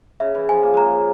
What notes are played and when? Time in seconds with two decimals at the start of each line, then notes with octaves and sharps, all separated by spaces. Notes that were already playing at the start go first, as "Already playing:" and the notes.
0.20 C#3 E5
0.35 E3
0.49 F3 G#5
0.63 A#3
0.74 G#3 A#3 A#5